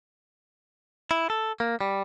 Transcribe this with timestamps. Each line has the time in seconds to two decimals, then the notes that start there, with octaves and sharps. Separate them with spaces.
1.11 E4
1.30 A4
1.60 A#3
1.81 G3